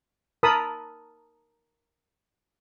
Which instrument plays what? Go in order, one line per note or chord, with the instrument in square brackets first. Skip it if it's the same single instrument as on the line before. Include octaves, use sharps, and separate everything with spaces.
[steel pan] A#4 A5 B5 D#6 E6